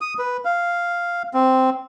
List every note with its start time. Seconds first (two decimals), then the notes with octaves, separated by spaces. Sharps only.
0.01 D#6
0.19 B4
0.45 F5
1.34 C4